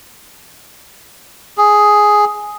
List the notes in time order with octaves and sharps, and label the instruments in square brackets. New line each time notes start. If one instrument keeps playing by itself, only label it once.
[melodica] G#4